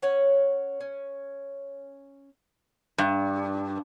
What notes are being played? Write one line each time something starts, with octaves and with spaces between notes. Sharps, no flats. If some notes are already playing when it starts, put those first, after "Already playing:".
C#4 C#5 F#5
C#4
G2